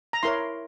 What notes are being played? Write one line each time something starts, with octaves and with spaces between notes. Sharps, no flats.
A#5
E4 A#4 C#5 C6